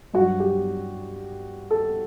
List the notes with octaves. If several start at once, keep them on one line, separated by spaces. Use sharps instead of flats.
G2 F#3 F#4
G4
A4